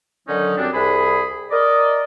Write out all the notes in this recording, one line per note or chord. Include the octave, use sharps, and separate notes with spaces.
D3 D#3 F#3 C#4 D#4
F#2 G3 C4 D4
C2 G#4 B5
A#4 D5 D#5